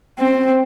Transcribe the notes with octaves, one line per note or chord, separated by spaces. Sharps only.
C4